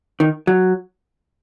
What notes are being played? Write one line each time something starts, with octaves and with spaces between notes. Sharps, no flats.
D#3
F#3